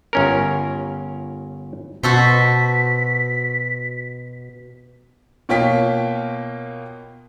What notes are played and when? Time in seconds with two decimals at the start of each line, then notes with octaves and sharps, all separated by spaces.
0.13 G1 C#4 A#4
2.03 B2 F#4 A4 C5 B6
5.49 B2 A#3 F4 C#5 G5 B6